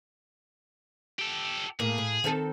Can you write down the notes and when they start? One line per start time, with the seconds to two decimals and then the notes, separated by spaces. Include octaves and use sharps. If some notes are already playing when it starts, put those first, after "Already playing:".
1.19 G4 A4
1.79 A2 A#3 G#4
1.98 A2
2.24 D#3 C4 A4